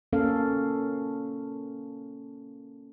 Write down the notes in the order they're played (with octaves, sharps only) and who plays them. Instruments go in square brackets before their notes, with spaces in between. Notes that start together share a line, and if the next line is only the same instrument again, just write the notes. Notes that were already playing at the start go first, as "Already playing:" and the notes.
[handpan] A#3 C#4 A4 F5